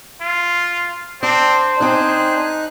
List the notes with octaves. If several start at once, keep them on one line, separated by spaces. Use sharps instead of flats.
F4
C4 D4 C5
C4 D4 D#4 G#4 F#6